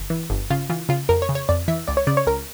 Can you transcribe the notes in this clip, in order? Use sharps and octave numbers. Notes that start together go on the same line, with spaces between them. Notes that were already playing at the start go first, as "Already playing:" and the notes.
Already playing: G1
E3
G1
C#3 F4
E3 F4
C#3 F4
F2 A#4
C#5
C#3
C#5
F2 D5
E3 E5
C#2 D5
C#5
C#3 D5
C#5
C#2 A#4